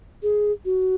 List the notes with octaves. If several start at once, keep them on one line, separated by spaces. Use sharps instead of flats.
G#4
F#4